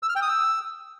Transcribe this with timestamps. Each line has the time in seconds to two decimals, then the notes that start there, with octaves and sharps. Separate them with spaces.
0.03 E6
0.09 F6
0.16 G5
0.22 D#6
0.29 E6